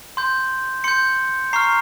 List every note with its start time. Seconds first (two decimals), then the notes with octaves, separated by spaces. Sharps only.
0.17 C6 G6
0.84 C6 G6 C#7
1.53 A#5 C#6 F6 C7